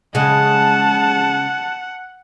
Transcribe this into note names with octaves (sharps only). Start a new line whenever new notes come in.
C#3 G#3 F#5 A5